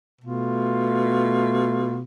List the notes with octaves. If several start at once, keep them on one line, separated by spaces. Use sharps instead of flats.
B2 A3 F4